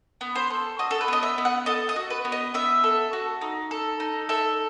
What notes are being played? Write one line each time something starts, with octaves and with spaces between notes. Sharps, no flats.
B3
C5
A4
F#4 D#5
A4
B4
B3 D#5
E5
B3
F#5
A4 D#5
D#5
F#4
B4
B3
D#5
B3 E5
A4
F#4
D#4
A4
D#4
A4 E5